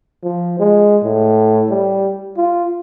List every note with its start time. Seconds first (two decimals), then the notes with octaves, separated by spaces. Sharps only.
0.24 F3
0.59 G#3
1.04 A2
1.70 G3
2.37 F4